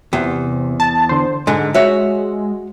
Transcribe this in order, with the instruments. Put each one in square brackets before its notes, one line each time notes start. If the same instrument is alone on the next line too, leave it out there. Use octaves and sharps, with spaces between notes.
[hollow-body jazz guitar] E2 [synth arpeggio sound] C3
[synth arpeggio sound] A5
D3 C5
[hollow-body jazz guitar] G#2 D3 [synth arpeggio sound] G#3
[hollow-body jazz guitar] F#4 C#5 E5